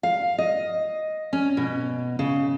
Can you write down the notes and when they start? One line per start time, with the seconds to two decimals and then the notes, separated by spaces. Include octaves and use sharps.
0.03 F5
0.38 D#5
1.33 C#4
1.57 B2
2.19 C#3